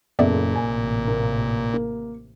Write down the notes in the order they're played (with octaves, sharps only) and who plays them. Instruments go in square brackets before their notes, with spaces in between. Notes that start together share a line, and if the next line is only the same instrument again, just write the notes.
[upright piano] F#1 C#3 A4 [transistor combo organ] A#2 [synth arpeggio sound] B3 D5 E5
[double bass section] A1 C3 [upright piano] G#5
[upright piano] A#3
A#3